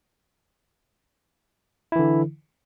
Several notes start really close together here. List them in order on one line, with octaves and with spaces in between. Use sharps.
E4 E3 D3